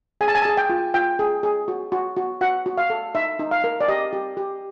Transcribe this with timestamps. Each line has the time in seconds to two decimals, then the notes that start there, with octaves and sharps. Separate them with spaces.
0.21 G#4 G#5
0.28 A5
0.35 G#5
0.42 A5
0.45 G#4 G#5
0.57 G5
0.70 F4
0.94 F4 G5
1.19 G#4
1.43 G#4
1.68 F#4
1.92 F#4
2.17 F#4
2.41 F#4 F#5
2.66 F#4
2.78 F5
2.90 A4
3.15 D#4 E5
3.39 D#4
3.51 F5
3.64 A#4
3.81 D5
3.88 G4 D#5
4.13 G4
4.37 G4